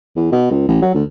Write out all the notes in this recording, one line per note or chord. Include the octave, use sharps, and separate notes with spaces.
E2
B2
C#2
A1
F#3
D2